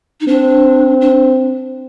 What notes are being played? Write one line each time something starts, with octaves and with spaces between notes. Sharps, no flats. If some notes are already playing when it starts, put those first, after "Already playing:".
D#4
C4 D4
D4